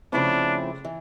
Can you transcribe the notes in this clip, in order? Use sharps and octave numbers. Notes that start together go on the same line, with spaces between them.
C#3 F3 A3 C4 D4 E4
E3